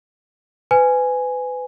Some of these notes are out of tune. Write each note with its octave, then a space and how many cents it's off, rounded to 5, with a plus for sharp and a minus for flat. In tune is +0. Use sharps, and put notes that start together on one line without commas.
B4 +30 G#5 +0